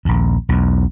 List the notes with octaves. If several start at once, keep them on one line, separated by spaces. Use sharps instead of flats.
A#1 D#2
B1 E2